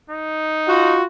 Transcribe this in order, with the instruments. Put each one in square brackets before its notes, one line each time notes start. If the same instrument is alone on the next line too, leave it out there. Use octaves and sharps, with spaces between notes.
[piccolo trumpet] D#4
[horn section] F4 F#4